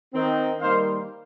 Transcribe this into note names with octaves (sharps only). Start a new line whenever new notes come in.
D#3 C4 D#4
D#3 G3 A#3 D#4 C5 F5